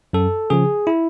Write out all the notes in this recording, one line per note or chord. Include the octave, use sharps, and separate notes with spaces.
F#2 A4
C#3 F3 G#4
E4